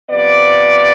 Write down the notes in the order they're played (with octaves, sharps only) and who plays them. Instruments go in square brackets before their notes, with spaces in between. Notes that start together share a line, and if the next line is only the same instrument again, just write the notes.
[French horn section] C3 F3 B3 D5